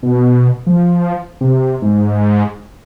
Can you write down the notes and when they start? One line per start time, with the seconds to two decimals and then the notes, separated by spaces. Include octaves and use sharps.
0.03 B2
0.67 F3
1.41 C3
1.82 G#2